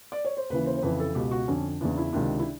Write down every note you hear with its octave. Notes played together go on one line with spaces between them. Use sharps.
D5
C#5
C5
D#2 C#3 E3 B4
C5
C5
F2 C#3 E3 B4
A4
C#2 B2 G4
F#4
F2 D3 C#4
E2 C#3 E3 D4
E4
C#2 C3 D#3 D4
E4